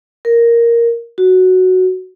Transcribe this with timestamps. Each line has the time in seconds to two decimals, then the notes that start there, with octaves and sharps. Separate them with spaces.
0.25 A#4
1.18 F#4